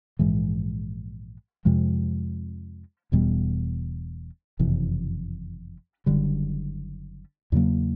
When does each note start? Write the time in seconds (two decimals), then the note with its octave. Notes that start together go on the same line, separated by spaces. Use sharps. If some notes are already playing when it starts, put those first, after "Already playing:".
0.19 A#1 G#2 E3 G#3
1.65 F2 C3 F3 G#3
3.12 E1 E2 B2 G3
4.59 F#1 F2 C3 E3
6.06 F#1 F#2 D3 G3
7.52 E2 C#3 F#3 A#3